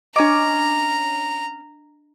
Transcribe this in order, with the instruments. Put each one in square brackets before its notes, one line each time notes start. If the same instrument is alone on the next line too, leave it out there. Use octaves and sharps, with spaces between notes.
[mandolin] C#4 D6 [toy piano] D4 D#5 [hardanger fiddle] A#5